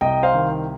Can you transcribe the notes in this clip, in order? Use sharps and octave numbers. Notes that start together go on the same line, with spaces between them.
C2 D#5 G5
C5 F5
D#3